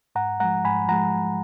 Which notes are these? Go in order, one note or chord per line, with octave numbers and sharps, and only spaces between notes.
G#2 F#5 A#5
F3 G#3 F#5 A#5
G#2 G#5 B5
F3 G#3 F#5 A#5